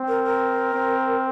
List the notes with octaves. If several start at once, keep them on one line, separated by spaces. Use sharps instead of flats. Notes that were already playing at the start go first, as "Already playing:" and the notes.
Already playing: C4
A#4
A#4
C4